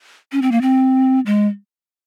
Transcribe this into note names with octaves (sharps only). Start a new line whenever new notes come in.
C#4
C4
A#3
C4
G#3